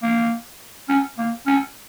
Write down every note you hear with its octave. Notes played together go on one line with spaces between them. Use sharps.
A#3
C#4
A#3
C#4